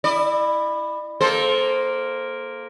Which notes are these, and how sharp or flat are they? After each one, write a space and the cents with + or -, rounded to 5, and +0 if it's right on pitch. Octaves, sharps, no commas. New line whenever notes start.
E4 +0 D5 +40
A#3 +0 A4 -20 C5 +0